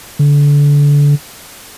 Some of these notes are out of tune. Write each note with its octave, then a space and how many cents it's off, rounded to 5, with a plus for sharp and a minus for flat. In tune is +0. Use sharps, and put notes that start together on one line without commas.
D3 -25